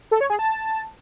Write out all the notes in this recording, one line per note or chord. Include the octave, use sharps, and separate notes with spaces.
A4
C#5
G#4
A5